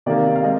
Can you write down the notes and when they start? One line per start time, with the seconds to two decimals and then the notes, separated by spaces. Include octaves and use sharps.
0.06 C3 D#3 A#3 D5
0.36 F5
0.44 G#3 C4 D#5